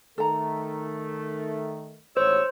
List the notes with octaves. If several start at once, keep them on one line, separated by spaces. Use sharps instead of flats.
D#3 A3 A4 A#5
A1 D#2 G#2 C5 C#5 E6